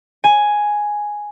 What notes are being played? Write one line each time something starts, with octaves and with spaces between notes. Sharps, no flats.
G#5